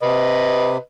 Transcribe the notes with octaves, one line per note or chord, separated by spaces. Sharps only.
C3 B4 D#5